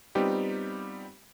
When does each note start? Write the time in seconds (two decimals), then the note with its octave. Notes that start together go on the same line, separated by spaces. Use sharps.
0.15 G3 B3 C4 D#4 F4 G4